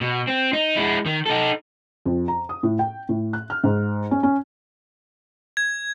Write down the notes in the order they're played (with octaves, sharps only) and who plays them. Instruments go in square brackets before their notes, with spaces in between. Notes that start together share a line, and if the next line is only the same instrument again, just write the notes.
[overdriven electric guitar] B2
C4
D#4
G#3 E4
D#3
D#4 A4
[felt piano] F2
A#5
D#6
A2
G5
A2
F#6
F6
G#2
C#4
C#4
[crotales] G#6